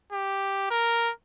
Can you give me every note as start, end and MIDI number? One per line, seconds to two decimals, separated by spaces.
0.13 0.70 67
0.71 1.11 70